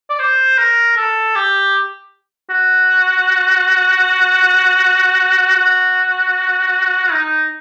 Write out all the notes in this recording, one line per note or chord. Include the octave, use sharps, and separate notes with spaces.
D5
C5
A#4
A4
G4
F#4
F#4
D#4